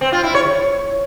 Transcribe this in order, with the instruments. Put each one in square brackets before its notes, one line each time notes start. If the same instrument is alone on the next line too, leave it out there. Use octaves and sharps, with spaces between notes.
[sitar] C4
F4
E4
C#5